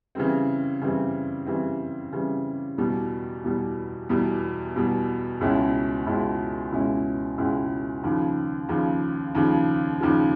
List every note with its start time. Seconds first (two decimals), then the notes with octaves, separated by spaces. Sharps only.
0.15 C#3 E3 G3 C4
0.81 C#3 E3 G3 C4
1.47 C#3 E3 G3 C4
2.12 C#3 E3 G3 C4
2.78 E2 B2 G3
3.44 E2 B2 G3
4.09 E2 B2 G3
4.76 E2 B2 G3
5.41 C#2 B2 G#3 C#4 E4
6.06 C#2 B2 G#3 C#4 E4
6.72 C#2 B2 G#3 C#4 E4
7.38 C#2 B2 G#3 C#4 E4
8.04 D#2 C#3 F3
8.69 D#2 C#3 F3
9.35 D#2 C#3 F3
10.01 D#2 C#3 F3